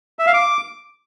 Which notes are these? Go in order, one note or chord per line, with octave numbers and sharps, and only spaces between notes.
E5
F5
D6